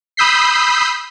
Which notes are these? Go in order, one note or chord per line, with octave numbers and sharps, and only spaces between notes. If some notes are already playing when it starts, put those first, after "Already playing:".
B5 D#6 E6 G6 B6 C7